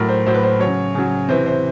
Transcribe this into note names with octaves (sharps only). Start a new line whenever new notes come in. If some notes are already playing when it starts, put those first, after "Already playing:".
Already playing: A2 F#3 A#4
C5
A2 F#3 C5
B4
C5
C#3 F#3 C#5
C#3 F#3
C3 E3 C5
C5